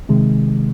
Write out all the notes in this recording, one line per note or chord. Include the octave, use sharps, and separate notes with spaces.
C3 D#3 G#3